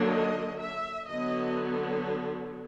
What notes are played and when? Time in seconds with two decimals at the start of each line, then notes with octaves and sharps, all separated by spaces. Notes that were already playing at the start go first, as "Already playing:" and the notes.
Already playing: D3 F#3 A#3 D4
0.09 D#5
0.60 E5
1.08 D3 F#3 B3 D#5